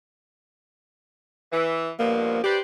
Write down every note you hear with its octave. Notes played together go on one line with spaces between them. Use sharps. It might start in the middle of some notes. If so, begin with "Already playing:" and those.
E3
G2 B2 F3 A#3
G4 B4 C5 D5